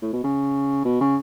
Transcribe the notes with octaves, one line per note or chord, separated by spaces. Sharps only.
A2
B2
C#3
B2
C#3